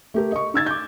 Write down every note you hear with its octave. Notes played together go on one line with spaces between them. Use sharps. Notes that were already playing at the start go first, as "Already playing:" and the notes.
A3 G4 A#4
D#5 C#6
D#4 E6 G#6 A6
D6 G6